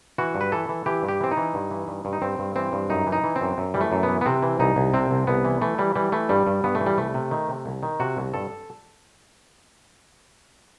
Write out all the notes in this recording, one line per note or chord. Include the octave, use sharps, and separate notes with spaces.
E3 F#4
G2
B4
E3 A4
E3
E3 G4
G2
G4
E3 C4
D#4
E3
G2
E3
G2
G2
D#4
G2 C4
G2
E3 C4
G2
F#2 D#4
E3
D#4
E3
C4
F#2
F#2
E3 G3
A3
F#2
B3
E3
B3
C3 C4
E3
C2 D#4
C2
C3 C4
C2
C2 B3
E3
E3 A3
E3 G3
E3 G3
E3 A3
G2 G3
G2
G2 B3
A3
E3
G3
C2 A3
C3
D#3
C3
C2
D#3
C3 F#4
C2
G2 A4